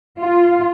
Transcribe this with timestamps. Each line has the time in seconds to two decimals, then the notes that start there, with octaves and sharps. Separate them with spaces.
0.19 F4